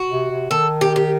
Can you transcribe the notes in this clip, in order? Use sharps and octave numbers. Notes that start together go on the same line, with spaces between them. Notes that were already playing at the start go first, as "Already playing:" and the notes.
Already playing: F#4
C3
C3
D#3 A4
G4
G4